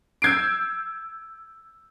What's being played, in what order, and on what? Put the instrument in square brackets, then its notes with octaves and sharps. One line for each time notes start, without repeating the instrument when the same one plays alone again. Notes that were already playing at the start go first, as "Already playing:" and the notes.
[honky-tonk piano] E6 G6 G#6 C7 D7